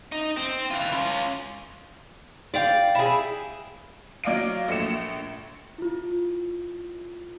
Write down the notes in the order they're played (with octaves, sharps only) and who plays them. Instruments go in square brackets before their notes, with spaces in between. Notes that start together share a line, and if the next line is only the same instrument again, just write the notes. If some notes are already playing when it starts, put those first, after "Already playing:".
[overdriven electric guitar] D#4
C4
E3 F4
C#4 F4
[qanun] D5 F5 G5
[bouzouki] E4 G#4
[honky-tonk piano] F#3 D5 D#5 F5 D7
A#1 A3 C#7 E7
[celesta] E4 F4